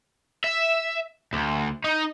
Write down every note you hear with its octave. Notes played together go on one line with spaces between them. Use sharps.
E5
D2
D#4